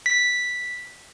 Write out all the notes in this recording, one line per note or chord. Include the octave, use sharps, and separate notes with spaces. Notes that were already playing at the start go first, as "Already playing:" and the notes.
B6